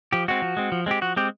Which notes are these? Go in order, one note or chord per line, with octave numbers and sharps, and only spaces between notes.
F3 G4
G#3 C4 F#4
F3
G#3 C4
F3
G#3 C4 G4
F3 F#4
G#3 C4 G4